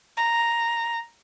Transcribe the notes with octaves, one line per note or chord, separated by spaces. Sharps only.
A#5